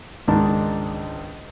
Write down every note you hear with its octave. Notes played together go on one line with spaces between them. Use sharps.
C#2 G#2 D#3 D4 A5